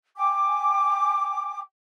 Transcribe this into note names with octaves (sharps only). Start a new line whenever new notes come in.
G5 G#5 D6